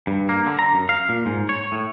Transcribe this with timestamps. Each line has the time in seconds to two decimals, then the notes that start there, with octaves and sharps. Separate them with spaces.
0.07 G2
0.29 A#3
0.46 D3
0.59 A#5
0.74 F#2
0.89 F5
1.09 A#2
1.26 G#2
1.49 C#5
1.72 A2